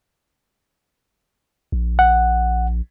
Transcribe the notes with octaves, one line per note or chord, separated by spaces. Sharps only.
A#1
F#5